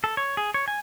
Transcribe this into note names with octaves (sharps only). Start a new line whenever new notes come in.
A4
C#5
G#4
C#5
G#5